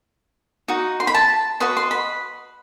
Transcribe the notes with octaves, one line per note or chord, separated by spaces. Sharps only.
D#4 F#4
C6
B5
A5
F#4 B4 D#5 C6
C6
B5